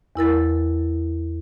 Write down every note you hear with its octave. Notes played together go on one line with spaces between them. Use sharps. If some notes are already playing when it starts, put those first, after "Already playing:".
E2 E4 A#4 A6